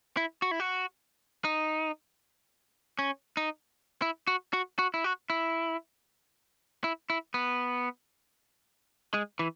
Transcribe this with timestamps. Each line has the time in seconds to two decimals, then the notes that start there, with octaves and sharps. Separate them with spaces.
0.17 E4
0.42 F#4
0.51 E4
0.60 F#4
1.44 D#4
2.99 C#4
3.37 D#4
4.02 E4
4.27 F#4
4.53 F#4
4.79 F#4
4.94 E4
5.04 F#4
5.30 E4
6.84 E4
7.10 E4
7.34 B3
9.14 G#3
9.39 E3